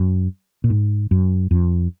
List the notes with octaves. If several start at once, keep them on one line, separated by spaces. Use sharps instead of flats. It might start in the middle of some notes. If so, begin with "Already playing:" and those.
Already playing: F#2
A#2
G#2
F#2
F2